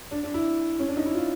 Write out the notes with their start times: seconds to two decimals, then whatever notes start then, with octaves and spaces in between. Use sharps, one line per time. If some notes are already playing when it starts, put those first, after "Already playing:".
0.11 D4
0.23 D4
0.34 E4
0.79 C#4
0.88 D4
0.97 D#4
1.06 E4
1.15 F4